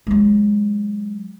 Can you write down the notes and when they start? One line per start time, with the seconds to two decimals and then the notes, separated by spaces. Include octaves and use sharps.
0.07 F#3 G#3